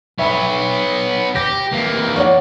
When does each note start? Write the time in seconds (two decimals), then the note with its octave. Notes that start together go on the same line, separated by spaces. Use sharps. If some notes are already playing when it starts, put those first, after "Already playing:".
0.19 B3 C#5 E5 B5
1.36 G4 A#6
1.73 E3 A#3
2.16 C#5 D5 F#5